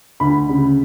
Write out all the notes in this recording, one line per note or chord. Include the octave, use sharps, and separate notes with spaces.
D2 B5
C#3